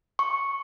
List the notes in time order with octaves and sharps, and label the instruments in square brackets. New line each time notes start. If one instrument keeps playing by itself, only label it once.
[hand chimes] C#6